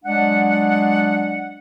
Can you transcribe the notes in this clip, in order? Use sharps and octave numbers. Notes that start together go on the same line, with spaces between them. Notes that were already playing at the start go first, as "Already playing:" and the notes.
F#3 G#3 D4 D5 F#5